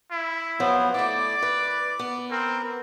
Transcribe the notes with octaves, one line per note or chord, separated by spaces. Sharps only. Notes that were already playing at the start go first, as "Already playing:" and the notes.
E4
F3 F#3 B3 C5
A3 E4 D5 D6
B4
B3
C4 A#4